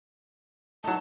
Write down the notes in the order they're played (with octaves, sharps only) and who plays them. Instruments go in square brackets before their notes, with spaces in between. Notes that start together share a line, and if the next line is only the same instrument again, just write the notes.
[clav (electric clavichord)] F#3 A3 [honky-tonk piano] D#4 F#4 [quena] A5